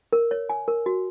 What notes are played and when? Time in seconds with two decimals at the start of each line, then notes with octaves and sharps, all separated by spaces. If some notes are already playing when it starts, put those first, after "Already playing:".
0.13 A#4
0.31 C#5
0.49 G#5
0.68 A#4
0.86 F#4